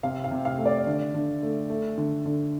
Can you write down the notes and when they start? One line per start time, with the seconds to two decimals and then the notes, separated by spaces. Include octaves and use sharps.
0.03 C3 F5
0.24 F5
0.31 C3
0.45 F5
0.58 A3
0.65 D5
0.87 D3
1.14 D3
1.43 A3
1.70 A3
1.98 D3
2.26 D3